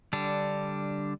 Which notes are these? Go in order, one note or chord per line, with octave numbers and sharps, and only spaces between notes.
D3 G3 D4